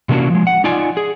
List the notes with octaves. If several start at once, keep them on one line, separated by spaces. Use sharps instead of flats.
C3 E3 A#3 C#4 D4 F#4
F3 G#3
F#5
D#4 F4 D5 G#5
G#4